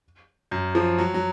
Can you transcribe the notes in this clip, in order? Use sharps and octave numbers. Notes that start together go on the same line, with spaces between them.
F#2
F3
F#3
F#3